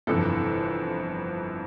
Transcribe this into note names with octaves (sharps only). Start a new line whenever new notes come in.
G1 F2 C3 E3 A4